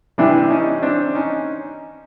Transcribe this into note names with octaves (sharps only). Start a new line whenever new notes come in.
C3 E3 G3 D4 E4
C#4 D#4
C4 D4
C#4 D#4